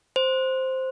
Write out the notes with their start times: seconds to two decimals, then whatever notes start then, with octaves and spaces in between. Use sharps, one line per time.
0.16 C5